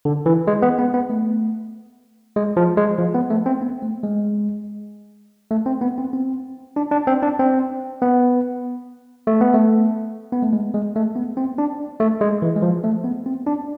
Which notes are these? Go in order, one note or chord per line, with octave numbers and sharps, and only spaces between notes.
D3
E3
G#3
B3
B3
B3
A3
G#3
F3
G#3
F3
B3
A3
C4
B3
A3
G#3
A3
C4
B3
C4
C4
D4
D4
C4
D4
C4
B3
A3
B3
A3
B3
A3
G#3
G#3
A3
B3
C4
D4
A3
G#3
E3
G#3
F3
A3
B3
C4
D4